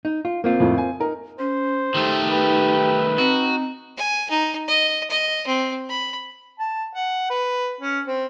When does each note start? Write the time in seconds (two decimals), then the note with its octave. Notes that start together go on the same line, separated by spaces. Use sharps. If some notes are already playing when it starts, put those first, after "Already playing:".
0.05 D#4
0.25 F4
0.44 A#3 C4 F4
0.60 F2 A2
0.78 G#5
1.00 D#4 A#4
1.39 C#4 C5
1.95 D#3 A3 D#4 G4
2.30 G4 B4
3.18 C4 D#4 F#4
3.97 G#5
4.30 D#4
4.68 D#5
5.10 D#5
5.47 C4
5.89 B5
6.60 A5
6.94 F#5
7.30 B4
7.81 C#4
8.07 C4